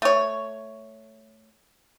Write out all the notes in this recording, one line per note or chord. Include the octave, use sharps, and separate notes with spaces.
A3 C#5